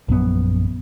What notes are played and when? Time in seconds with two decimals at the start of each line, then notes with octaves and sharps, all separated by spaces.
0.09 A#1 F#2 B3